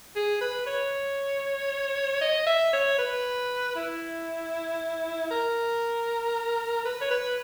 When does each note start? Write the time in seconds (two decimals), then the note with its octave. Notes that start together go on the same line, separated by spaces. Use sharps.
0.16 G#4
0.41 B4
0.66 C#5
2.21 D#5
2.46 E5
2.73 C#5
2.99 B4
3.76 E4
5.31 A#4
6.85 B4
7.01 C#5
7.10 B4